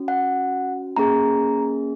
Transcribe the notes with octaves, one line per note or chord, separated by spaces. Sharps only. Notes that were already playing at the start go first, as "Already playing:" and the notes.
Already playing: C#4 F#4
F#5
A#3 C#4 G#4 A#5